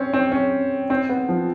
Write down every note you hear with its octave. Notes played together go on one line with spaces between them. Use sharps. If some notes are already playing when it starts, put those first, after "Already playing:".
Already playing: C4 C#4
C4
C#4
C4
B3
F3